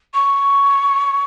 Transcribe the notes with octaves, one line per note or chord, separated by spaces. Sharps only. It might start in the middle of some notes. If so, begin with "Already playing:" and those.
C#6